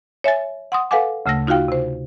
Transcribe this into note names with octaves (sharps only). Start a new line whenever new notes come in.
C#5 E5 G#5 A6
F#5 C6 D#6
A4 B4 F5 F#5 G#5 D6
D2 C#3 A3 E6 A#6
D#4 F4 F#4 F5 G5
C3 C5